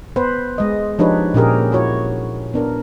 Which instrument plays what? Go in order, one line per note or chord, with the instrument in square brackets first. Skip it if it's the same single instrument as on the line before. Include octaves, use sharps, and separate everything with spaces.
[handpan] B3 B4 C5
G#3 D#5
F3 D4 D#4 G4 B4 C#5
A#2 C#4 G4 G#4 A#4
E4 F#4 C#5
B3 D4 A#4